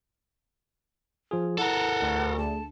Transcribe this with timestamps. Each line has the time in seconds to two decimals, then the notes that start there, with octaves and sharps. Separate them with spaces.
1.31 F3 F4 G#4
1.58 E4 A4 A#4 F#5
2.02 D2
2.38 A3 G#4 A5